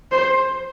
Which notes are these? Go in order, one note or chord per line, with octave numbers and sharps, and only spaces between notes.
C5